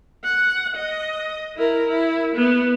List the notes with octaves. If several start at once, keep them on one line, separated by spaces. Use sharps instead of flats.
F#5
D#5
E4 A#4
E4
B3